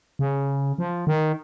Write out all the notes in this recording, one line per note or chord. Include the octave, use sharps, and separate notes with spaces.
C#3
F3
D#3